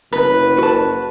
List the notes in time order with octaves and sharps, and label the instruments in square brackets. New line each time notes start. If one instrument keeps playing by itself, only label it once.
[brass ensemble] F#1 [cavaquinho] B4
[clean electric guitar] F#4 A5